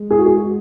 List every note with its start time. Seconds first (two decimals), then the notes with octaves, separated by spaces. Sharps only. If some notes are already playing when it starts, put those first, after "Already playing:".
Already playing: G#3
0.11 G#4
0.19 F#4
0.26 G#4